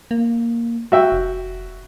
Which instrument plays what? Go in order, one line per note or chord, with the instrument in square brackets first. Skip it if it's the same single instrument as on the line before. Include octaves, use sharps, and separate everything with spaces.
[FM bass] A#3
[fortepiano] F#4 E5 G5
[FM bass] F1